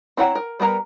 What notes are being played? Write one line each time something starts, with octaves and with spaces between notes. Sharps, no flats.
C4 E4 C#5 F#5 A#5
A#4
G3 B3 A#4 A#5